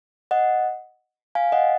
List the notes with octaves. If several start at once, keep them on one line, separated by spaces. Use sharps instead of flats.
D#5 F#5
F5 G#5
D#5 F#5